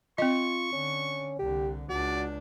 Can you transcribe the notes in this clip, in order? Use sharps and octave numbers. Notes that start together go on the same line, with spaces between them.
C4 F4 D#5 C#6
D3 C#4
C2 D3 G4
C#2 D4 F#4 D5